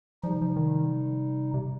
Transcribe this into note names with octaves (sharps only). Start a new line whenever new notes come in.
C3 F3 G3 D#4
F3
D#3
C3